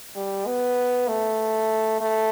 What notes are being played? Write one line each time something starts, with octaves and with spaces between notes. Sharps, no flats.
G3
B3
A3
A3